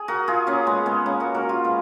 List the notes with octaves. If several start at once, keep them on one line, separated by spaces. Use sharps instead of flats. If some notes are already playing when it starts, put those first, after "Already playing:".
Already playing: G#4
F#4 A#4
F4 G#4
A#3 C#4
G#3 B3
G#3 B3
A#3 C#4
F#4 A#4
F#4 A#4
F4 G#4
G#3 B3